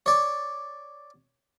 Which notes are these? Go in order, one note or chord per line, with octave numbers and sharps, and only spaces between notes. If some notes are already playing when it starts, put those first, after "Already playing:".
C#5 D5